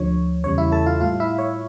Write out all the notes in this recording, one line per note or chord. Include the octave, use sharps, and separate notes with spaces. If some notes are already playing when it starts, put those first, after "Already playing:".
Already playing: D2 D3 F3 C#5
E2 C#3 G3 C#5
E4 E5
A4 A5
F4 F5
A2 G3 F4 F5
E4 E5
C#5